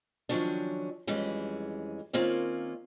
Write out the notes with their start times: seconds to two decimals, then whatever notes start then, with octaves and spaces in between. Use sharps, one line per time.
0.29 D#3 F3 F#3 C#4 D4
1.07 F2 E3 G3 G#3 C#4
2.13 D#3 A#3 C4 C#4 F4 D5